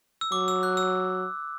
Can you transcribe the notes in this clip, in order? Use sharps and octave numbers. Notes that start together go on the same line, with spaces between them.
E6
F#3 D6
E6
F#6
E6